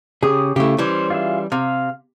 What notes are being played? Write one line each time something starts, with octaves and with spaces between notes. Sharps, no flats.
C#3 G4 G#4 D#6
C#3 A3 E4 G4
E3 G3 C#4 C5
F4 G#4 E5
C3 F5